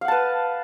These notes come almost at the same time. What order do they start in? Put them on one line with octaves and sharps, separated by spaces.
F5 F#5 A5 B4